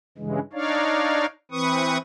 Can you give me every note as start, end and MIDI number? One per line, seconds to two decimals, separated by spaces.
0.18 0.39 43
0.18 0.39 49
0.18 0.39 52
0.18 0.39 56
0.53 1.26 62
0.53 1.26 63
0.53 1.26 73
0.53 1.26 74
0.53 1.26 77
1.51 1.98 52
1.51 1.98 60
1.51 1.98 71
1.51 1.98 85
1.51 1.98 87